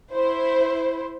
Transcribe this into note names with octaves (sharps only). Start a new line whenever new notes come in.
E4 C5